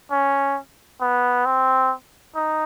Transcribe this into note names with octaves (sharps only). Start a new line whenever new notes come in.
C#4
B3
C4
D#4